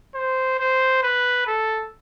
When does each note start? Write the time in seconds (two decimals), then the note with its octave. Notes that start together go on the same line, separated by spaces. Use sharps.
0.15 C5
0.59 C5
1.03 B4
1.47 A4